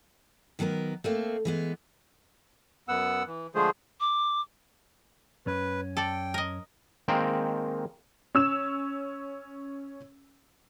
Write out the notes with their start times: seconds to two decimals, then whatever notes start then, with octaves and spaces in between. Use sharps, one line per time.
0.59 D#3 F#3 B3 G#4 A#4
1.04 A3 A#3 C4
1.45 E3 G#3 B3
2.88 F#2 B3 F#5 E6
3.27 E3
3.55 D3 F3 G#3 A3 G#4 C5
4.00 D6
5.47 F#2 C#4 B4
5.97 A4 D5 G5
6.34 A#4 D#5
7.08 D#3 G#3 A#3 C4 A#4 G5
8.35 C#4 E6 E7